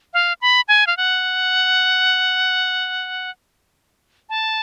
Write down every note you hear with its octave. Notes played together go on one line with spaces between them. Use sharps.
F5
B5
G#5
F5
F#5
A5